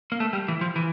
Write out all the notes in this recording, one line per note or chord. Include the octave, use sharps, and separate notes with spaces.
A#3
A3
G3
E3
F3
E3